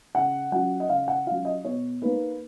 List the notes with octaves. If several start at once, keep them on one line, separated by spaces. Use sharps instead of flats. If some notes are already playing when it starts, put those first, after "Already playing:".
C#3 F#5
F#3 C#4 F4 F#5
D#5
C#3 F5
F#5
F#3 C#4 F4 F5
D#5
B2 C#5
A#3 D#4 B4